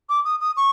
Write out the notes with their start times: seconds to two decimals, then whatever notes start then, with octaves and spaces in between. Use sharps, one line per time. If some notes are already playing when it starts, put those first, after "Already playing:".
0.09 D6
0.25 D#6
0.40 D#6
0.57 C#6